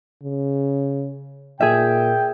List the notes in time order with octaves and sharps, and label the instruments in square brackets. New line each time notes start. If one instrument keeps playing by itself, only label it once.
[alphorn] C#3
[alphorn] A#2 [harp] G#4 E5 [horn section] G5